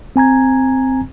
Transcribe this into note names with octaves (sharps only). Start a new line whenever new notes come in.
C4 G#5 A#5 G#6